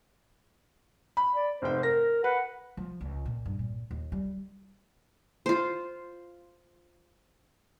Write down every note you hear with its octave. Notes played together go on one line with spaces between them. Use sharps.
B5
D5
F1 G#2 C5 G5
A#4 A#6
B4 F#5
F3
C#2
A#2
G2
A#2
D#2
G3
F4 C5